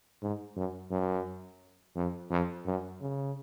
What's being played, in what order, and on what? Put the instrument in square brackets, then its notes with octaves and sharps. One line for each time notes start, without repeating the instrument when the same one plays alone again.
[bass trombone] G#2
F#2
F#2
F2
F2
F#2
C#3